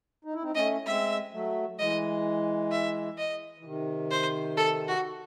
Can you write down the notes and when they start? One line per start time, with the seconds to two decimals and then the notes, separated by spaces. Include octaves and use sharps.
0.25 D#4
0.34 E4
0.43 C4 D#4
0.55 A3 C#4 D#5
0.86 G#3 C4 E5
1.32 F#3 A3
1.79 E3 G#3 D#5
2.72 E5
3.18 D#5
3.59 E3
3.64 C3 D#3
4.11 C5
4.57 A4
4.88 F#4